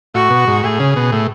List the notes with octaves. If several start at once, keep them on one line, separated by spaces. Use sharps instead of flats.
A2 F#4
B2
G#2
A2 G#4
C#3
B2
A2